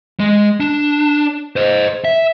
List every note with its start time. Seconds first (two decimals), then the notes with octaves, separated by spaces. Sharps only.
0.20 G#3
0.60 D4
1.56 C5 D#5
2.05 E5